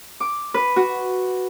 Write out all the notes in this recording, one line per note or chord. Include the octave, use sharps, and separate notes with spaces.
D6
B4
F#4